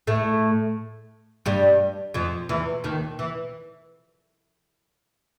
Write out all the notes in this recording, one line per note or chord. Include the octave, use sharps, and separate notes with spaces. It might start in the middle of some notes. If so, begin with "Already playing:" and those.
A2 A3
G2 G3
F2 F3
E2 E3
D#2 D#3
E3